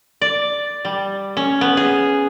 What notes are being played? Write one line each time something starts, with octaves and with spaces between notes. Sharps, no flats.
D5
G3
C#4
B3
G#4